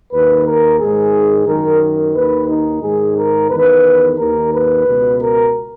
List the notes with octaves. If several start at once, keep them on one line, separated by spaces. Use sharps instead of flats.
D#2 D#3 B4
A#4
G#2 D#3 G#4
F#2 D#3 A#4
D#2 D#3 B4
D#4
G#2 D#3 G#4
A#4
E2 D#3 B4
D#2 D#3 A#4
B4
C#2 B2
A#4